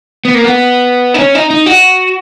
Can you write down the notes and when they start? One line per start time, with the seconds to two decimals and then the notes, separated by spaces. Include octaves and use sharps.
0.25 B3
0.35 A#3
0.44 B3
1.14 D#4
1.19 C#4
1.35 D#4
1.51 D#4
1.66 F#4